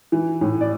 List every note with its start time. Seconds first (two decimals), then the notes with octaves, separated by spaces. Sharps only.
0.12 E3
0.41 A2
0.61 D5